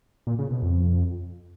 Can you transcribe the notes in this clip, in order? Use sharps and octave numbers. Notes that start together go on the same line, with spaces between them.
A#2
C#3
B2
F2